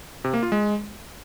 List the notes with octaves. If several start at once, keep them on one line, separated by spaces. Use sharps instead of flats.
C3
A#3
F4
G#3